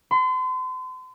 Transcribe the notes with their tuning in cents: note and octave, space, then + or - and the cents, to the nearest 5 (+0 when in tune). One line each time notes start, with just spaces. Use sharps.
C6 -40